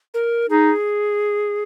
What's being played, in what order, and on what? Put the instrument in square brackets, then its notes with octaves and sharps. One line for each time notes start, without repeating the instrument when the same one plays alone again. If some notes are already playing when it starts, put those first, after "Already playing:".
[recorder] A#4
[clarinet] D#4 [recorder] G#4